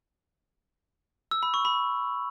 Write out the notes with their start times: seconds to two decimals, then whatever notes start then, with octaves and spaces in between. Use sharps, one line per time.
1.31 E6
1.43 B5
1.54 C#6
1.65 B5